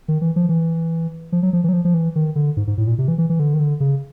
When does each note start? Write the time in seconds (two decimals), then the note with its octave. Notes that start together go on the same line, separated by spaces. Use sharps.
0.08 D#3
0.21 E3
0.36 F3
0.49 E3
1.32 F3
1.43 F#3
1.53 F3
1.64 E3
1.69 F#3
1.73 F3
1.85 F3
1.94 E3
2.16 D#3
2.35 D3
2.57 G#2
2.67 G#2
2.78 A2
2.87 A#2
2.98 C3
3.08 E3
3.18 E3
3.30 E3
3.40 D3
3.54 D#3
3.60 D3
3.80 C#3